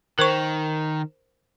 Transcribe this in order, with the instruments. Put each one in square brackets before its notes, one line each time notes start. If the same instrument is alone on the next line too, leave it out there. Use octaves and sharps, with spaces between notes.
[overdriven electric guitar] D#3 [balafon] A#4 C5 C#6